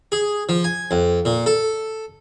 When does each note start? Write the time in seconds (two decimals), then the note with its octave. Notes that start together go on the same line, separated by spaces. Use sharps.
0.12 G#4
0.49 F3
0.64 G#5
0.91 F2
1.25 A#2
1.46 A4